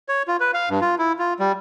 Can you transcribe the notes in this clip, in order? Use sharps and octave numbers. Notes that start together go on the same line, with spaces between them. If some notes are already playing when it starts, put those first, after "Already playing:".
C#5
F4
B4
F5
G2
F4
E4
F4
G3